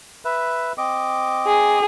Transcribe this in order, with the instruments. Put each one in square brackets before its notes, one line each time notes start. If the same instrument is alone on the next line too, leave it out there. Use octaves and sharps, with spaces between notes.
[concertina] B4 E5
C4 D#5 D6
[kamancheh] G#4